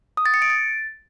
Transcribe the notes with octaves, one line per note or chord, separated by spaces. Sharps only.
D#6
A6
C#7
D7
A6